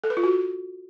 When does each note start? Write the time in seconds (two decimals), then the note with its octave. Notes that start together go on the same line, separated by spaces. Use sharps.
0.04 A4
0.10 B4
0.17 F4
0.23 F#4